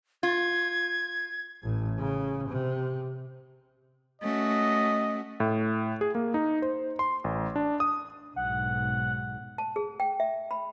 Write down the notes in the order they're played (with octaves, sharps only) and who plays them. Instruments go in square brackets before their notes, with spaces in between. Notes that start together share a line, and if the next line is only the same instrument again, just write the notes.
[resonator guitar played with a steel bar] F4 [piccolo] G#6
[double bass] A1 A2
C#3
C3
[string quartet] A3 C#4 F#4 [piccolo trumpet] D#5
[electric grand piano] A2
G#4
A#3
D#4
C5
C6
A1
D4
D#6
[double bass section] B1 G#2 [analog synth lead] F#5
[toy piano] A5
G#4
G5
E5
B5